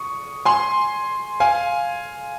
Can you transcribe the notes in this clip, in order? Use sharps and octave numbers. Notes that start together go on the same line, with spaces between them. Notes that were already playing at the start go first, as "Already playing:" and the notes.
Already playing: C#6 D#6
G#5 C6
F5 G#5